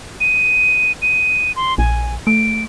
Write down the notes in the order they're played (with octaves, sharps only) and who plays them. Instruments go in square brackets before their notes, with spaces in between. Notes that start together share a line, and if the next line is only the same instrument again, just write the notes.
[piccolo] D#7
D#7
C6
[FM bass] A#1 [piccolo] G#5
[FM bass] A3 [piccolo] D7